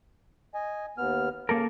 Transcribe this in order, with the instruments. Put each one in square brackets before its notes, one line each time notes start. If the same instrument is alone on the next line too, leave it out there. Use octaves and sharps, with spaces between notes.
[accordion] D#5 G#5
D#2 B3 F6
[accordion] C#3 [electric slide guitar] A#3 A4 A#4